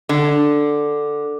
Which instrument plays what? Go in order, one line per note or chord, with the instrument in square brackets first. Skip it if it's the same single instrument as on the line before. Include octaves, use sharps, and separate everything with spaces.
[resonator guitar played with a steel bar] D3